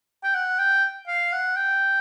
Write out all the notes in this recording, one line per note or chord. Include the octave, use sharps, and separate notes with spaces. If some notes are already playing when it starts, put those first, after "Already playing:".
G5
F#5
G5
F5
F#5
G5